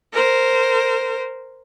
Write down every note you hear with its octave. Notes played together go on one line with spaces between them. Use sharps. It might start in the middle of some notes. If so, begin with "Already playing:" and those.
A#4 C5